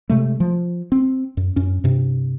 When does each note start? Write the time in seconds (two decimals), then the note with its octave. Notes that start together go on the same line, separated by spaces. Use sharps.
0.10 C3 G#3 A3
0.40 F3
0.92 C4
1.37 F#2
1.56 F#2 C#4
1.84 G2 C3